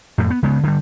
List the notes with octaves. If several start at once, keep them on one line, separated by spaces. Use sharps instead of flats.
F2 A2
B3
C#3 G#3 B3
D3 G3